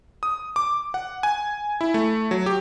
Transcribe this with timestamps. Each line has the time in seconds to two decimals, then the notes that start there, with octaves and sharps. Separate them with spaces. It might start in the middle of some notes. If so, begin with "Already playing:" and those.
0.23 D#6
0.56 D6
0.94 F#5
1.23 G#5
1.81 E4
1.94 A3
2.31 F#3
2.46 G4